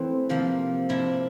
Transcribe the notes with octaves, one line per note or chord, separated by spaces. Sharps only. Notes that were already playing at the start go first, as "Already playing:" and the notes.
Already playing: E3 A3 C4 E4
C3 F3 A#3
C3 F3 A#3 E4